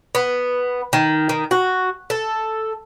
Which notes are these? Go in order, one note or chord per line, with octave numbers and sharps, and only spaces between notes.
B3
D#3
D#3
F#4
A4